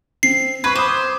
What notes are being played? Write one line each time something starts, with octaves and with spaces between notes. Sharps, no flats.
C4 C7
B4 C#6 G#6
C5 D6 D#6